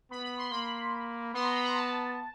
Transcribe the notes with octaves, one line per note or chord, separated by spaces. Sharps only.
B3 B5
B5
C6
A#3 B5
B3 C6
A#5
B5
A#5
A5